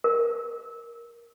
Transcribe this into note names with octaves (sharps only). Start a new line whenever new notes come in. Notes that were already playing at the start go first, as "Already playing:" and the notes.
A#4